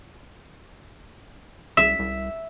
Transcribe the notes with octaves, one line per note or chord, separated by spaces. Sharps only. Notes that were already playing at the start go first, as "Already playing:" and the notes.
C2 E5
C2